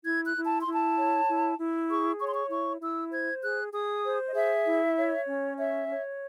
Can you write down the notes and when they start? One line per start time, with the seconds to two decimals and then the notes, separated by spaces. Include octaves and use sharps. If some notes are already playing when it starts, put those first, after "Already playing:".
0.05 E4 G#6
0.26 F#6
0.36 E4
0.46 A5
0.60 C6
0.67 E4
0.73 A5
0.97 C#5
1.28 E4
1.58 E4
1.89 G#4 C#6
2.20 C#5 C#6
2.27 C6
2.34 C#6
2.50 E4 C#6
2.81 E4 E6
3.12 C5 G#6
3.42 G#4 F#6
3.73 G#4 D#6
4.04 C5
4.26 D#5
4.34 G#4 E5
4.65 E4
4.96 C#5
5.27 C#4
5.57 C#5 E5
5.88 C#5